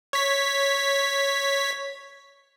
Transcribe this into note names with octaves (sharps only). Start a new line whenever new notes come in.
C#5 B6